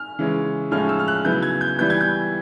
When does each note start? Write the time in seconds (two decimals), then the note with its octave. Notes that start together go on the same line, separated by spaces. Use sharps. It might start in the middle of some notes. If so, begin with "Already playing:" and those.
Already playing: F6
0.19 C#3 E3 G#3 C#4
0.71 A2 F3 G#3 C#4 F6
0.89 E6
0.99 F6
1.08 F#6
1.25 C#3 F#3 B3 E4 G6
1.42 G#6
1.61 G6
1.78 E3 G3 B3 E4 G6
1.90 G#6
2.01 G6